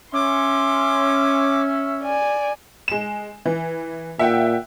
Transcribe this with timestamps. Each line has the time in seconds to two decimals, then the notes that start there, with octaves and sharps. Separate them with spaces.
0.14 C#4 E5 C6 D6
2.03 D5 G#5
2.88 G#3 E7
3.46 E3
4.19 A#2 E5 F#5 G5